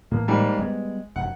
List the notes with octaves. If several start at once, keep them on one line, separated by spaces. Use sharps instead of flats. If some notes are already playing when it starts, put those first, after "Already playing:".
A2 E3 A#3
G#2 G3 A#3
G3 G#3 B3
F1 F#2 F#5